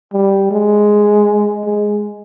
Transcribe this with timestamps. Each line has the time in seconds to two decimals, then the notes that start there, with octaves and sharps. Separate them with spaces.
0.13 G3
0.51 G#3
1.65 G#3